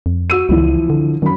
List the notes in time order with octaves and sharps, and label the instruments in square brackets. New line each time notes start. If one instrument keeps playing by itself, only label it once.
[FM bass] F2
[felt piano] F#4 E6 D#7
[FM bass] C#2 [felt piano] E3 F3 E4
[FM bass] D3
[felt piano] F#2 B5 [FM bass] D#3